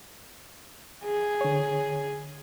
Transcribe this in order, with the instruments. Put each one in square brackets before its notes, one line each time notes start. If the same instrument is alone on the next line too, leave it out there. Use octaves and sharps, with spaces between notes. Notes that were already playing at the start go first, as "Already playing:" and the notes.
[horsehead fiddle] G#4
[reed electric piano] D3 C#5